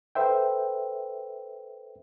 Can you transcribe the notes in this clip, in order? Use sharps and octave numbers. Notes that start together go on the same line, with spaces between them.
A4 B4 C5 E5 G5